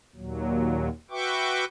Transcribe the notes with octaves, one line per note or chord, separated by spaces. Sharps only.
D#2 A#2 F#3
F#4 B4 E5 G5 C#6 D6